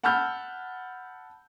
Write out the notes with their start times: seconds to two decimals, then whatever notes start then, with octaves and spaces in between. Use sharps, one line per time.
0.03 F#5 A5 B5 E6 F6 G6